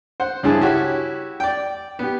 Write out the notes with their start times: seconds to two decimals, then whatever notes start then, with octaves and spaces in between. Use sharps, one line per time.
0.20 C5 F#5
0.43 C#2 G2 E4 G#4 A5
0.61 E4 F#4 G4 C#5
1.40 D5 G5
1.99 B3 G4